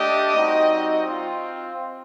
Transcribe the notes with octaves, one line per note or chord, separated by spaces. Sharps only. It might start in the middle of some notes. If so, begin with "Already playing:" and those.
Already playing: A3 D4 G4 D#5
G3 C4 D#4 F#4
C4 F4